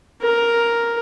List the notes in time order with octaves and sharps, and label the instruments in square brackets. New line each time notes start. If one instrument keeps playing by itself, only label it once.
[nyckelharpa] A#4